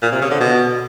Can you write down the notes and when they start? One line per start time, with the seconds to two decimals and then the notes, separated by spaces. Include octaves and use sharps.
0.02 A#2
0.12 C3
0.21 C#3
0.31 D3
0.40 B2